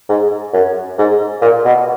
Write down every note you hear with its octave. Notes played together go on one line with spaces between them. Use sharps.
G#2
F#2
G#2
A#2
B2